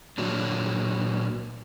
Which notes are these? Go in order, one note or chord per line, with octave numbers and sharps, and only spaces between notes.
A#2 F#3 D4